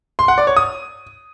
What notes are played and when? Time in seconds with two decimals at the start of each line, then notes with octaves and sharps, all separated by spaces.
0.19 C6
0.28 F#5
0.38 D5
0.47 C#5
0.57 D#6